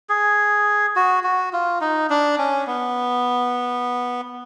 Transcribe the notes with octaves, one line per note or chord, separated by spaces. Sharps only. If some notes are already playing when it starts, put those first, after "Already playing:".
G#4
F#4
F#4
F4
D#4
D4
C#4
B3